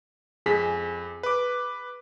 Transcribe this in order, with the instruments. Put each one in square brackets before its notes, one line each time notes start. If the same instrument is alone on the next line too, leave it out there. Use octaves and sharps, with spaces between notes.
[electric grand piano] F2 B6 [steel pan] G#4
[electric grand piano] B4 D6